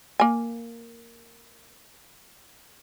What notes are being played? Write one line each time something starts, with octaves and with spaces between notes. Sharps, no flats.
A#3 G#5